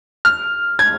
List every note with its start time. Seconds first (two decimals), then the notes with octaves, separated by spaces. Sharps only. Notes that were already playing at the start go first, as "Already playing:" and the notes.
0.25 F6
0.79 G#6